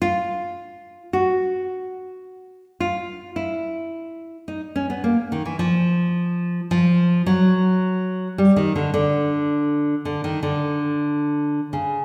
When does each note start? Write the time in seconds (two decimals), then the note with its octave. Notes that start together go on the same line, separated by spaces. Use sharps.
0.02 F4
1.13 F#4
2.80 F4
3.36 E4
4.48 D#4
4.76 C#4
4.90 B3
5.04 A#3
5.32 D#3
5.46 E3
5.59 F3
6.71 F3
7.26 F#3
8.38 G3
8.56 D#3
8.76 D3
8.94 D3
10.05 D3
10.24 D#3
10.43 D3
11.73 C#3